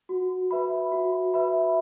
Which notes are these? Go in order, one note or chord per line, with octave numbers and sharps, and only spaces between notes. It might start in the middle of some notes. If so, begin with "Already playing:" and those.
F#4
B4 E5 B5
F#4
B4 E5 B5